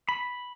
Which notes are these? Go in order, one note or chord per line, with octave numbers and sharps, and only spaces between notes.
B5